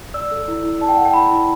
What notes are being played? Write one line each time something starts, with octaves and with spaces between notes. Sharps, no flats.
D5 E6
A4
E4
E4
D5 A5
G5
A4 F#5
G5
E4 B5
E4